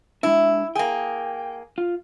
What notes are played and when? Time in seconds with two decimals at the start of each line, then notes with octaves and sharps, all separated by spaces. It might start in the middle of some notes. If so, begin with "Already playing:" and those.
0.23 G#3 D4 E4
0.75 A#3 G#4 G5
1.78 F4